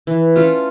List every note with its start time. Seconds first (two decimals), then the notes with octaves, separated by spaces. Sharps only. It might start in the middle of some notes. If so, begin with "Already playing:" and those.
0.07 E3
0.36 A3 C#4 F4